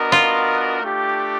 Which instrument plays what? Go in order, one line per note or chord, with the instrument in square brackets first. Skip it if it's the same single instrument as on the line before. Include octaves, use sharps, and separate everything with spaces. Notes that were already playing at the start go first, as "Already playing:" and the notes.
Already playing: [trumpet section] B3 D4 F#4 A#4 D#5
[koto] F4
[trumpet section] A3 D4 G4